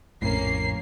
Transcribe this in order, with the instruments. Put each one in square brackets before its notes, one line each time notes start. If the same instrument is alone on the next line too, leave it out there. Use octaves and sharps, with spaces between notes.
[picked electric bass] A#1 F2 A2 [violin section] A#3 C#4 C7